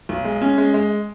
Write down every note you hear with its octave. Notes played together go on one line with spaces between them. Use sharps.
B1
G#3
C#4
G#3
G#3